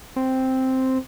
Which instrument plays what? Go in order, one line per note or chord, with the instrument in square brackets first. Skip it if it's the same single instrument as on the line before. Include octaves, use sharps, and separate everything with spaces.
[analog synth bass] C4